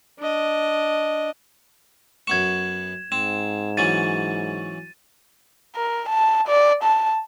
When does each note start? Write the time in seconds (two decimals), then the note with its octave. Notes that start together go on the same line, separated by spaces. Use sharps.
0.20 D4 D#5
2.27 F#2 B3 C#6 G#6 E7
3.12 G#2 C4 E7
3.77 E3 F#3 C#4 A6 D#7
5.76 A#4
6.09 A5
6.48 D5
6.84 A5